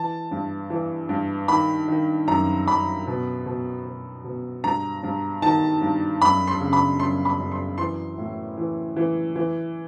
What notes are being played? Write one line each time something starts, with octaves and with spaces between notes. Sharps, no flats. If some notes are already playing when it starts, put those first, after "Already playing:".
Already playing: E3 A5
G2
E3
G2
D#3 B5
D#3
F#2 A#5
F#2 B5
B2
B2
B2
B2
G2 A#5
G2
D#3 A5
G2
F#2 B5
C6
C#3
B5
F#2 C6
B5
F#2
C6
E3 C6
A2
E3
E3
E3